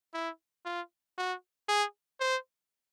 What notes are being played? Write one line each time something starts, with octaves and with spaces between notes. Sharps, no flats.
E4
F4
F#4
G#4
C5